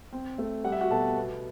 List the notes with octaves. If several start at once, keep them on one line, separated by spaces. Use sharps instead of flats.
C4
A3
G3 F#5
E5
F#4 F#5
B2 A4 A5
B3